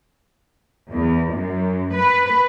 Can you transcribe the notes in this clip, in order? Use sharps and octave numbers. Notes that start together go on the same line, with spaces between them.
E2
F#2
B4